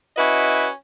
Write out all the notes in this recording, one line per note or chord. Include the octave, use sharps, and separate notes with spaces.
C#4 E4 F#4 B4 D#5